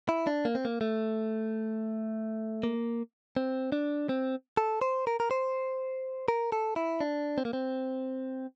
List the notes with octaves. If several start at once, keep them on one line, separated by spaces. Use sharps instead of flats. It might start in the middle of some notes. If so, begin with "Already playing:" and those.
E4
D4
A#3
C4
A#3
A3
A#3
C4
D4
C4
A4
C5
A#4
A#4
C5
A#4
A4
E4
D4
C4
A#3
C4